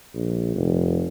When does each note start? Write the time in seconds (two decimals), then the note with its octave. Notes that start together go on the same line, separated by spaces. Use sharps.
0.15 A#1
0.56 F1